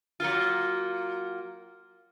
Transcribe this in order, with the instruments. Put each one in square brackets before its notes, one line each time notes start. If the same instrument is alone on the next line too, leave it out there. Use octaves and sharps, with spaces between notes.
[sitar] F#3 A#3 F4